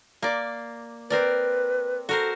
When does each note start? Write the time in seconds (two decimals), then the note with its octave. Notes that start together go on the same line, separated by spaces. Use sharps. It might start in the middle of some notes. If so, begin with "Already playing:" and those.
0.22 A#3 D5
1.10 C4 A#4 B4 D5
2.09 F#4 A4 A#4 C5